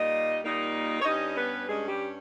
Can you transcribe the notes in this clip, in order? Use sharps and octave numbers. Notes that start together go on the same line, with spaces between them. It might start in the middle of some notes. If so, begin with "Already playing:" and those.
Already playing: A#2 G3 A#3 D#4 D#5
A#2 G3 A#3 D#4
C#5
G2 G3 C#4 D#4 D#5
B3 B4
G2 G3 G#3 C#4 G#4
G3 G4